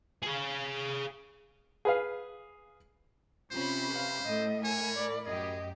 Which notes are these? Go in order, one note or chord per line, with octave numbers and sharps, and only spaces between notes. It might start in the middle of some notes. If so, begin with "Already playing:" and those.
G#4 F5
G#4 B4 F5
C3 C#4 F4 C5 B5
B4 F5
A2 A4 D#5
A#4 C#5 G#5 B5
D5
F#2 G4 G#4 D#5